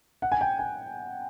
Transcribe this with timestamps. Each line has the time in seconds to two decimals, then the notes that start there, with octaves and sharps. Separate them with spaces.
0.22 F#5
0.32 G#5
0.41 G5
0.59 G#5